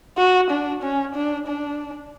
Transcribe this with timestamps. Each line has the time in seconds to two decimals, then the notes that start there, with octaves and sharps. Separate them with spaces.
0.18 F#4
0.50 D4
0.82 C#4
1.15 D4
1.47 D4